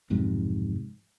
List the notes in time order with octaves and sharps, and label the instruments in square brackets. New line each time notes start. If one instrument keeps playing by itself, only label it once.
[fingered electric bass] B1 F2 G#2 C3